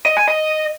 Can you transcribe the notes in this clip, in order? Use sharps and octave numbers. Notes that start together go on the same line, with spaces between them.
D#5
G#5
D#5